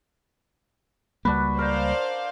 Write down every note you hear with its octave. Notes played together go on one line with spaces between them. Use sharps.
C#2 G3 A#3 D4 F#4 B4 B5
A#4 C5 D5 F5 G5